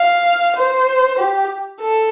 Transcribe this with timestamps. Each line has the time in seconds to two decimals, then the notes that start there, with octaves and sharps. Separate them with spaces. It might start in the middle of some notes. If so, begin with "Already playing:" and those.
Already playing: F5
0.56 C5
1.19 G4
1.81 A4